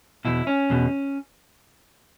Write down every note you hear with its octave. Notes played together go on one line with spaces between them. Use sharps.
E2 B2 E4
C#4
E2 B2